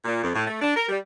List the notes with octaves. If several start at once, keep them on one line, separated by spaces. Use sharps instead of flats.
A#2
F2
A2
A3
D4
A#4
G3